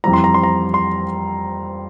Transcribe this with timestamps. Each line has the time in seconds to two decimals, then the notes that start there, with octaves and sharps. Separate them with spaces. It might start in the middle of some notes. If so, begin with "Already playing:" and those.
0.04 F2 E3 G3 C4 A#5
0.13 C6
0.24 A#5
0.34 C6
0.43 A#5
0.74 C6